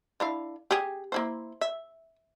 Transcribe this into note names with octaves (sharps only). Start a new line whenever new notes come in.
D3 E4 F5
G4 G#4
A#3 E4 C5
E5